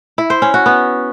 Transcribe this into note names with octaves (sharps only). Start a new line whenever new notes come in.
E4
C5
C#4
F#4
B3